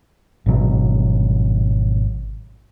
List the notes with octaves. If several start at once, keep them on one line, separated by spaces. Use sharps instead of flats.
G#1 B2 F#3